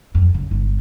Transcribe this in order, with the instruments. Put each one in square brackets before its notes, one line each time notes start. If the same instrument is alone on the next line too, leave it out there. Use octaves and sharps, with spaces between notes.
[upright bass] F2 F#3
C#3 F#3
G1 G3